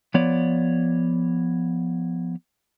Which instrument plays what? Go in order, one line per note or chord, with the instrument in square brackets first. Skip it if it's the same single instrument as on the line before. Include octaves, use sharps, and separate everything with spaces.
[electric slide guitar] F3 B3 C#5 D5